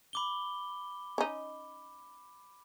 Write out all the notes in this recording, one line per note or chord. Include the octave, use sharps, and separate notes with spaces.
B5 D6 G7
C#4 D#4